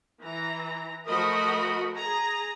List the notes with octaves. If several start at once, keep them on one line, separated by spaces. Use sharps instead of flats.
E3 A#5
F3 A3 F#4 A#4 D#5 B5
G#4 A#5